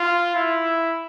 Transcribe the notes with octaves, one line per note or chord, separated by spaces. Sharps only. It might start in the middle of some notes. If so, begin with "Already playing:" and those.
Already playing: F4
E4